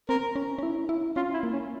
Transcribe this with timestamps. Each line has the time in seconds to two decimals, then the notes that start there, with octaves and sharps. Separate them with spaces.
0.09 C4 A#4
0.36 C#4
0.59 C#4
0.63 E4
0.89 E4
1.16 C#4 F4
1.33 E4
1.43 A#3
1.53 C#4